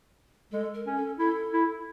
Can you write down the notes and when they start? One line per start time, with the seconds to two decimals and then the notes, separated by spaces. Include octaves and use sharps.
0.52 G#3 A4
0.74 A#4
0.86 C#4
0.96 A4
1.19 E4 A4
1.53 E4